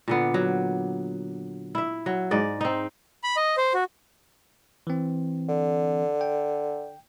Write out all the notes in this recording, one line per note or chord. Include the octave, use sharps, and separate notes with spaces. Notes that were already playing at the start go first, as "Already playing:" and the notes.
A#2 D3 B3
F#3
E4 E5
F#3
G#2 D5 D#5
C4 D#4
B5
D#5
C5
F#4
E3 C4
D3
G5